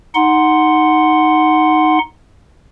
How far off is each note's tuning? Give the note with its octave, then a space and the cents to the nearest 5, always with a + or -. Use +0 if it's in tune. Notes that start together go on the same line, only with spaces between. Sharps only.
D#4 +0 F#5 +0 C6 +0